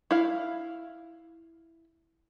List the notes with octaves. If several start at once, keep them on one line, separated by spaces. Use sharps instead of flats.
E4 F5